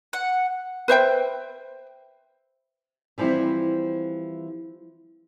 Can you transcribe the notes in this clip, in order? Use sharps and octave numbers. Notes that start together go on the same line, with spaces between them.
F#5
B4 C5 E5 G5
E3 F3 G3 C4 E4